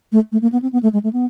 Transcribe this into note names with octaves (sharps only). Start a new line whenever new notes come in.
A3
A3
A#3
B3
C4
B3
A3
G#3
A3
B3